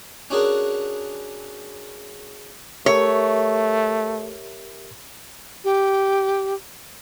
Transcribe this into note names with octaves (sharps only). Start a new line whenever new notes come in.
C#4 D4 F#4 G#4 A#4
A3 G4 A#4 C#5 E5
G4